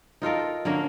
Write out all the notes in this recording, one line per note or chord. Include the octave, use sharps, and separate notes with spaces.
D#4 F4 A4 A#4
D3 A#3 C#4 A#4